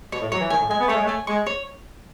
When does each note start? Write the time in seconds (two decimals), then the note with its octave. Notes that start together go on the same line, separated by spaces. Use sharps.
0.12 B2 C#5
0.22 A2
0.32 F#3 C#5
0.41 E3
0.50 D#3 G#5
0.61 A2
0.70 G#3 G#5
0.80 B3
0.88 A3 C#5
0.96 G#3
1.05 A3
1.09 G#5
1.27 G#3 C#6
1.47 C#5